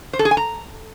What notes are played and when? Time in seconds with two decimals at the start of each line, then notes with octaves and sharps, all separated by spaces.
0.13 C5
0.19 A4
0.25 G#4
0.31 G#5
0.37 A#5